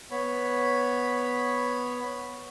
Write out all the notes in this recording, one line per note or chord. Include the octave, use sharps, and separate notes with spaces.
B3 C#5 B5